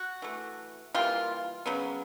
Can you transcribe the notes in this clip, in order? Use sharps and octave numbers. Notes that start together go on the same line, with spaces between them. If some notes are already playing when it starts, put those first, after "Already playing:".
Already playing: F#4
E3 A3
E3 G3 A#3 F4
C#3 F#3 B3